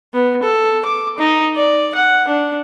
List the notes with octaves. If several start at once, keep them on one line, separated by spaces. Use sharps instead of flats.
B3
A4
D6
D#4
D5
F#5
D4